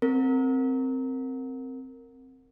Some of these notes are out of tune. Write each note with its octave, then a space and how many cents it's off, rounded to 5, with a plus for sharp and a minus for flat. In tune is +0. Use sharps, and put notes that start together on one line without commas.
C4 +0 A#4 -15